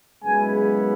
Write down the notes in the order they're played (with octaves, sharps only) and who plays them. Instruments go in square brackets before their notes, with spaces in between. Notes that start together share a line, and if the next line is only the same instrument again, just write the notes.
[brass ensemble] F#2 C#3 G#3 B3 E4 G#5